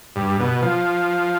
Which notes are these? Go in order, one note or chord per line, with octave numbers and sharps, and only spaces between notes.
G2
B2
F3